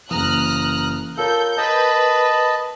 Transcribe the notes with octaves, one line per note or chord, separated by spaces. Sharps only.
F#1 E3 A#5 D#6 F6 F#6
F4 A4 A#4 C#5 G6
A#4 B4 D#5 A5